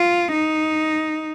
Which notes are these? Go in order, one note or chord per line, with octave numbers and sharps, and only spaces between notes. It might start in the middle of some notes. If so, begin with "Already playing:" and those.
Already playing: F4
D#4